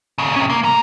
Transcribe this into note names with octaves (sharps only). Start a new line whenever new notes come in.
D#2 C#3
C3 C#4
A#3
D3 A#5